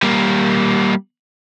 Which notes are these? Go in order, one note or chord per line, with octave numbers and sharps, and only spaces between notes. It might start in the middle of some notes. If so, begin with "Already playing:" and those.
G3 A#3